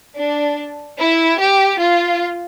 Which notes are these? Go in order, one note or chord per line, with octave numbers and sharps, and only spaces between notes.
D4
E4
G4
F4